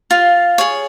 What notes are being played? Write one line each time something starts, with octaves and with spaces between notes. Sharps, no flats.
F4 F5
G#4 C#5